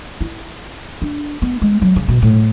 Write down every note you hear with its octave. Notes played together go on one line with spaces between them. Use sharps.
E4
D4
B3
G#3
F#3
C#3
B2
A2